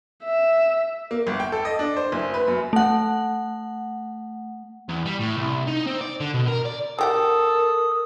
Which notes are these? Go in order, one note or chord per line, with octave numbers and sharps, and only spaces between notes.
E5
A#3
G1
G5
A4
D#5
D4
C5
F#1
B4
F#2
A3 F#5
E2
G3
A2
C2
D#4
C4
D5
D3
B2
A#4
D5
C#3 G4 A4 A#4 F#5 D#6